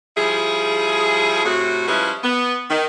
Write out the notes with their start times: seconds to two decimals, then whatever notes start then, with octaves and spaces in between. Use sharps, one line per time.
0.17 F3 G3 E4 G#4
1.45 A2 C3 A3 F#4
1.88 F3 G3 G#3 C#4 E4 B4
2.24 B3
2.70 D#3